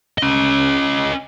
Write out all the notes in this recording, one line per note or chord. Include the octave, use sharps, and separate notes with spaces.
C#4 D#5